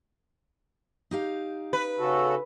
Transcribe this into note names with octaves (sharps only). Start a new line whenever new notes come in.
D#4 G4 F5
B4
C#3 F#4 A4